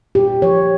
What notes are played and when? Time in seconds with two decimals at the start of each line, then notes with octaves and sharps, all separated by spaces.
0.15 A#2 G4
0.42 F3 C#5